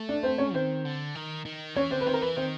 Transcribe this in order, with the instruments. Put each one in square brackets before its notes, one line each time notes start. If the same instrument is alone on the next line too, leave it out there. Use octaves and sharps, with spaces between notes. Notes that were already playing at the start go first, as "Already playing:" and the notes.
Already playing: [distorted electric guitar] A3
[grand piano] D4 D5
C4 C5
C#4 C#5
[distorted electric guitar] D#3 [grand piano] C4 C5
[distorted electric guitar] D3
D#3
D#3
[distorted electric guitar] E3 [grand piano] C#4 C#5
[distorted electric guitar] D3 [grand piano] C4 C5
[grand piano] B4
[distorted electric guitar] D#3 [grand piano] C4 C5
[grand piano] A#4
[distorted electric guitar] E3 [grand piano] B4
[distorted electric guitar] D#3 [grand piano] C4 C5